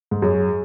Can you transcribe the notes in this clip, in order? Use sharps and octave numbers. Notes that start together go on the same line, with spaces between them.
G#2
F#2 G#4